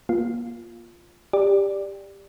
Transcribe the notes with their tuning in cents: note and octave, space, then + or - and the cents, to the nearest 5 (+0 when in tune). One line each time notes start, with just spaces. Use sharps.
A#3 +25 F4 -5
G4 +15 D5 +0